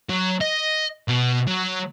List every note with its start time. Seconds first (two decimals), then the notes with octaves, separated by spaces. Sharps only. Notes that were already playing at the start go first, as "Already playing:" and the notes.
0.10 F#3
0.41 D#5
1.08 B2
1.47 F#3